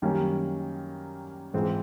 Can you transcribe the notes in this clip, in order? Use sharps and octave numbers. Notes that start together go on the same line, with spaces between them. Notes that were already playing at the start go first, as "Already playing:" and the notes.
F#2 D#3 G3 A#3 C#4
G#2 E3 G#3 C4 F4